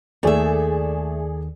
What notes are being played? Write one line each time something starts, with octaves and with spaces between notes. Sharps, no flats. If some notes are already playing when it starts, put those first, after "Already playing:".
D#2 D#3 A3 G#4 A4 D5 E5